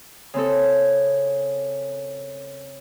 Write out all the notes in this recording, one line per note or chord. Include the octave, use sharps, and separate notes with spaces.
C#3 C4 A4